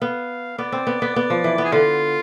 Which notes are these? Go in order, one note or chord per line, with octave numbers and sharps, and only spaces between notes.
B3 F5
B3 D5
C4
B3
B3
B3
F3
E3
B3
G#4
D3 F4